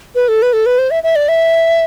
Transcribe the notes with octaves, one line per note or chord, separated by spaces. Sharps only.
B4
A4
B4
A4
B4
C5
E5
E5
D5
E5